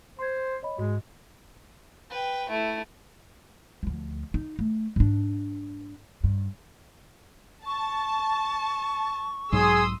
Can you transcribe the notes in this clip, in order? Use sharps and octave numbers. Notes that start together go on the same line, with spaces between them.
C5 C6 G#6
C#5 D#5 B5
G#2 G#3 F#4 D#5
B4 G5
A3 E4
D2 F3
D#4
A3
G#2 D4
G2
A5 C#6
B1 G#2 F#3 G#4 C6 D#6 E6